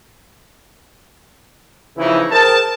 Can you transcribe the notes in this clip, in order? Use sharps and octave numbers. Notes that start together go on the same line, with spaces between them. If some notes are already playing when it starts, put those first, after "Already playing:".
C#3 E3 F3 C4 D#4 E4
G#4 A#4 C5 G5 A5